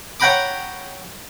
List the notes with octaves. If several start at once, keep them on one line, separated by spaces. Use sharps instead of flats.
C#5 F#5 G5 A#5 B5 D6